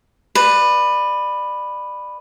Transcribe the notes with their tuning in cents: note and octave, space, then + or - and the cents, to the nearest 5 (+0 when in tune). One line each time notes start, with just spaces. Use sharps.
B4 +0 D5 +30